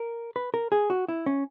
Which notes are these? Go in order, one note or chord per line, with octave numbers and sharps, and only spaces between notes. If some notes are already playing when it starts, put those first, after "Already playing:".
Already playing: A#4
B4
A#4
G#4
F#4
E4
C#4